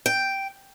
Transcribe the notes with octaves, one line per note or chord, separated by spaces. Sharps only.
G5